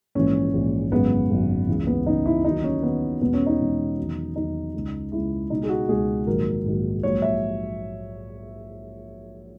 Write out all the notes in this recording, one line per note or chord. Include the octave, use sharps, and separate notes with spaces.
A#1 G#2 E3 C#4
A#1 G#2 E3
G#1 F#2 C#3 G#3 B3
G#1 F#2 C#3 G#3
C#2 C#3 E3
B3
C#2 C#3 E3 D#4
E4
D#2 D#3 F#3 D#4
C#4
D#2 D#3 F#3 B3
E2 B2 G#3 B3
C#4
D#4
E2 B2 G#3
E2 D#3 F#3
E2 D#3 F#3 D#4
C#2 C#3 G#3
C#2 C#3 G#3 E4
C#2 B2 G#3 D#4
G#4
F#4
C#2 B2 G#3 G#4
A#1 G#2 D#3 F#3 A#4
A#1 G#2 D#3 F#3
A#1 G#2 F#3 C#5
E5